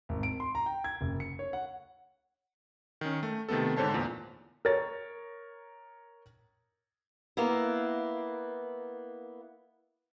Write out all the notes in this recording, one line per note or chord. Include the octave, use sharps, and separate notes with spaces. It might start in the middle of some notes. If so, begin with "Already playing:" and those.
G#1
D7
C6
A#5
G5
G#6
F#1
C#7
C#5
F#5
D#3 C#4
A3
C3 D#3 A3 B3 A4
G#2 D3 C5 C#5 A5
E2 A#2
A#4 C#5 A6
A#3 B3 E4